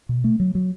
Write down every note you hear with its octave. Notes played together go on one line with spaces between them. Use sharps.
B2
A3
F#3
F#3